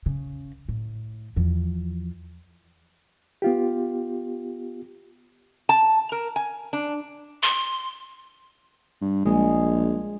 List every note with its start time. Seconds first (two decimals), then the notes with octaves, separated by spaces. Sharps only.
0.06 C#3
0.69 A2
1.36 E2 F3
3.42 B3 F4 G4
5.69 A5
6.12 A#4
6.36 G#5
6.73 D4
7.43 C6
9.01 G2
9.25 A#1 G#3